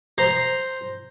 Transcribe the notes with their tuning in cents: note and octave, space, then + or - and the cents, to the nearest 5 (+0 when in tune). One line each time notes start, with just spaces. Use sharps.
C5 +0 A#5 +0